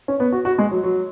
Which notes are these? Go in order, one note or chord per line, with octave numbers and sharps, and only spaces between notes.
C#4
B3
F#4
F#4
G#3
F#3
F#3